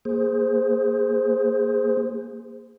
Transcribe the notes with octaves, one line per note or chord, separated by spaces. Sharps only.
A#3 G#4 C5